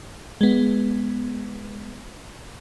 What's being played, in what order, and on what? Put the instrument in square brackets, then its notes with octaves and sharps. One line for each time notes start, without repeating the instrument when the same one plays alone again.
[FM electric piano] G#3 B3